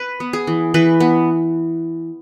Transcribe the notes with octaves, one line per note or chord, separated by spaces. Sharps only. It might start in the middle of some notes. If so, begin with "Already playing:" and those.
Already playing: B4
B3
G#4
E3
E3 B4
B3